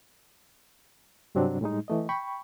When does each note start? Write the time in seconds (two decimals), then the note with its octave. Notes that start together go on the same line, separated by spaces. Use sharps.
1.35 G2 C3 F#3 C4 D4
1.61 A2 G3 G#3 D#4
1.88 E3 A3 D#5
2.09 G5 B5 C#6